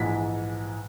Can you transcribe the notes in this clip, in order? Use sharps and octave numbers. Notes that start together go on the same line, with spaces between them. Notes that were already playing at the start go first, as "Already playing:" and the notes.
Already playing: A#1 G#2 E3 B6